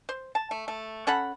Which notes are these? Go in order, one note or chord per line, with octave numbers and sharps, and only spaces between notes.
C5
A5
A3
A3
C#4 A4 F#5 B5